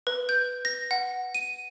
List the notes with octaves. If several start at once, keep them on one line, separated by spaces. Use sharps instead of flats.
B4
G6
A#6
F#5
D#7